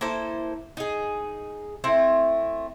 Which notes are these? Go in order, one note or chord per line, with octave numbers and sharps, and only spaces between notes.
A#3 E4 A4 C5
D#4 G#4
A3 C4 E4